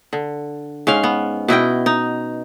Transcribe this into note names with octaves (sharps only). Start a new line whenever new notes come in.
D3
G#2 C#4 F5
B3
B2 E4 D#5 G5
D#4